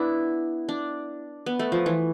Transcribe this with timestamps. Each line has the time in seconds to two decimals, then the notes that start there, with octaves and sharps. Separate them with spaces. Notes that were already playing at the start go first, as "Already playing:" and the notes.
Already playing: B3 D4 E4
0.69 D4
1.46 B3
1.59 A3
1.72 F3
1.86 E3